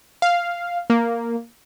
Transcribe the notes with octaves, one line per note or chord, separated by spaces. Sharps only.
F5
A#3